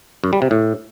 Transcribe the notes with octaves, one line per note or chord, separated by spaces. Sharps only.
F#2
G3
C3
A2